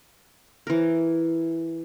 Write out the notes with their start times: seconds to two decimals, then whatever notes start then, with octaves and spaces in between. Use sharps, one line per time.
0.67 E3 A#4